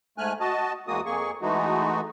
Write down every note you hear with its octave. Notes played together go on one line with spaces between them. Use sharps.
G#2 A3 G#5 F6 F#6
F#4 D#5 A5
E2 G#3 A#3 F#4 D#6
F2 A#3 G#4 C#6
E3 G#3 A3 D#4 F#4